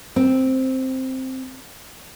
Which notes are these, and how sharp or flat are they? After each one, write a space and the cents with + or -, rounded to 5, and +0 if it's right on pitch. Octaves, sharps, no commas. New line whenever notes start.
C4 +0